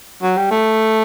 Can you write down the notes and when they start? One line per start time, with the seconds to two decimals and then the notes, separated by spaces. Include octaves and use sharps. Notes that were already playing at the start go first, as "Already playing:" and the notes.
0.23 F#3
0.37 G3
0.51 A3